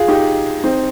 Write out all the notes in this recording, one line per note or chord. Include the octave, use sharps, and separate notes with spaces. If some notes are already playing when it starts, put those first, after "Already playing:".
Already playing: F4 G#4
D#4 G4
C4 D#4